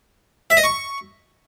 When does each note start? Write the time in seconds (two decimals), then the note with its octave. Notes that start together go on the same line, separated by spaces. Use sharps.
0.50 E5
0.57 D#5
0.64 C#6